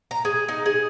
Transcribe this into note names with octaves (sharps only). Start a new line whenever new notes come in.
A#5
G#4
D#4
G#4